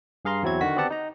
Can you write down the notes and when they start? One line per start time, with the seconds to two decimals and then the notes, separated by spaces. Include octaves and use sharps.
0.25 G2 G#4 F5 A#5 C6
0.43 E2 F#3 C4 E4 F#4 G#6
0.61 D3 D#3 F#4 F#5 B6
0.76 B3 C4 G4 D5 F#5 A5
0.90 D#4 A#5